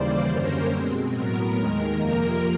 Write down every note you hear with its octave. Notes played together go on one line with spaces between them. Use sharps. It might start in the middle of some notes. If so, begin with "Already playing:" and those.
Already playing: D#2 C#3 E3 G3 A#3 C5 D5
F#2 D3 G3 A#3 C#4 A#4 C5
B2 G#3 C4
A2 F#3 B3 A#4
D#2 D#3 G#3
F2 C3 F3 A#3